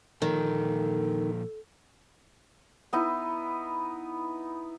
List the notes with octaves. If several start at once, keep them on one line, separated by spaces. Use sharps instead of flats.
F2 A#2 D#3 A4
B3 D#4 E4